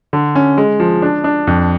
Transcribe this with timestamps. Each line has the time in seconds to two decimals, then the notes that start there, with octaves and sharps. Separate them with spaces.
0.13 D3
0.35 C#4
0.58 G#3
0.80 F3
1.02 D4
1.24 D4
1.47 F2